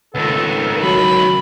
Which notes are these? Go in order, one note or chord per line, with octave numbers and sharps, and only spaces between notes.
C#2 D#3 B3 F4 A4
F#3 B5